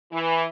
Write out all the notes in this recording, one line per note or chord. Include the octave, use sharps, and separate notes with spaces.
E3